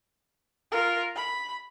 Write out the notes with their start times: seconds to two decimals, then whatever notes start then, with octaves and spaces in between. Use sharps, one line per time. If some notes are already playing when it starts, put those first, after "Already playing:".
0.71 F4 A#4
1.16 B5